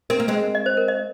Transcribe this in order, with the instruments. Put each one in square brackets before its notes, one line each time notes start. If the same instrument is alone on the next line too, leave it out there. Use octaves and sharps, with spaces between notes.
[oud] C4 [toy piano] A#4
[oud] A#3
G#3 C4
[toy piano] D#5
C5
A#4
D#5